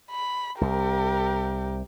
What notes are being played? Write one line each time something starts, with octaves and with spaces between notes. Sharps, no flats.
B5
C2 G4 A#4